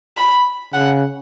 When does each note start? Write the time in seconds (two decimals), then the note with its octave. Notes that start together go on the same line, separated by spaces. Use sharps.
0.17 B5
0.74 C#3 F#5